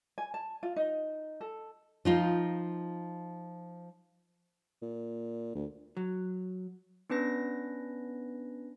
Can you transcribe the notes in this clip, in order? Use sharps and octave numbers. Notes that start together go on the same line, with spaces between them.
G#5
A5
F4
D#4
A4
F3 D#4 F4
A#2
D2
F#3
B3 C#4 D4 B4 A#6